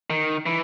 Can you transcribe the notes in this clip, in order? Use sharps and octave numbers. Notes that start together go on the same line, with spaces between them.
D#3
E3